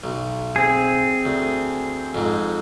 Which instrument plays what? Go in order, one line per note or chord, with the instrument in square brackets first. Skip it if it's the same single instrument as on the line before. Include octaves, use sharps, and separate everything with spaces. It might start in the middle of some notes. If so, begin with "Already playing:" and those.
[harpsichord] B1
[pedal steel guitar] C4 G#4
[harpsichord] D2
F2 G#2